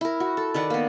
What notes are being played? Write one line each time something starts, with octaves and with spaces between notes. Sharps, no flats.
E4 A#4
F#4
A4
D#3 B4 D5 F#5
A#3 B3